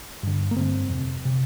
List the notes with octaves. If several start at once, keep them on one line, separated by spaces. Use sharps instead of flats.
G2 D3
A#3
G2 D3 C4
F2 C3
C3